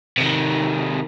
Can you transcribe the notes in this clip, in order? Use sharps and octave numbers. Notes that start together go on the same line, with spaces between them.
C3 D#3